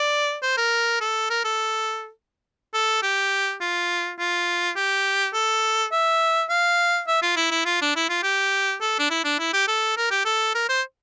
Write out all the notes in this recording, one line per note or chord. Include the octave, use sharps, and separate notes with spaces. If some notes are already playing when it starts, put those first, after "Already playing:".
Already playing: D5
C5
A#4
A4
A#4
A4
A4
G4
F4
F4
G4
A4
E5
F5
E5
F4
E4
E4
F4
D4
E4
F4
G4
A4
D4
E4
D4
E4
G4
A4
A#4
G4
A4
A#4
C5